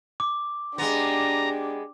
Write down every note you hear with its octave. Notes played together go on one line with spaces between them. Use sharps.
D6
G#3 B3 D4 G4 A#5